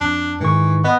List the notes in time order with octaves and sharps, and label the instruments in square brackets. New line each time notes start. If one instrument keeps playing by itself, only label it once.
[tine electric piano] F2 [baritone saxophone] D4
[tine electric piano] G#2 D#3 C#6 [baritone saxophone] E3
[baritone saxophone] B3 [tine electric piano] D#5